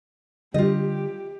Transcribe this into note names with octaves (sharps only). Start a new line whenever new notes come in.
D3 G3 F4 G4 D#5